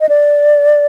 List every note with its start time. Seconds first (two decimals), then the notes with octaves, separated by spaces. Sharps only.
0.01 D#5
0.09 D5